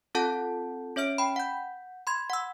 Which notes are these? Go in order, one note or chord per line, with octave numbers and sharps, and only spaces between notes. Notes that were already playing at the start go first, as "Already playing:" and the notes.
C4 F4 A4 F#5 A5 G6
C#4 C#5 E5 F6 D7
G5 B5
F#5 G6
B5 C6 G#6
F#5 E6